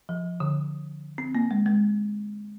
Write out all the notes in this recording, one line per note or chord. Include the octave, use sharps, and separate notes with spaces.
F3
D3
C4
A#3
G#3
G#3